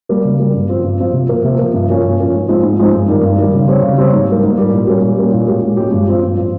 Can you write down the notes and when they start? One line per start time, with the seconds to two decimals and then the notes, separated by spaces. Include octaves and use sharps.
0.09 G3 A#3
0.25 C#3
0.40 G3 A#3
0.54 G2
0.69 F3 C4 F4
0.84 G2
0.99 F3 C4 F4
1.13 C3
1.29 F3 A#3
1.44 C3
1.59 F3 A#3
1.74 G2
1.89 F3 A#3 C#4
2.04 G2
2.19 F3 A#3 C#4
2.34 G#2
2.48 F3 G#3 C4 D#4
2.63 G#2
2.79 F3 G#3 C4 D#4
2.93 G2
3.08 D#3 G3
3.23 G2
3.38 D#3 G3
3.54 C#3
3.68 G3 C4 G4 C#5
3.83 C#3
3.97 G3 C4 G4 C#5
4.13 G#2
4.28 G3 A#3
4.43 G#2
4.58 G3 A#3
4.72 A#2
4.87 G3 A#3 C#4 G4
5.03 A#2
5.17 G3 A#3 C#4 G4
5.33 A#2
5.47 G#3 C#4 G4
5.63 A#2
5.77 G#3 C#4 G4
5.92 G2
6.08 F3 C4 F4
6.22 G2
6.37 F3 C4 F4